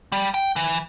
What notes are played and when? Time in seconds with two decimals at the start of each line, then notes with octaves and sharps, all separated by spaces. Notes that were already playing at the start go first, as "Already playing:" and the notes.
0.12 G3
0.34 G5
0.56 E3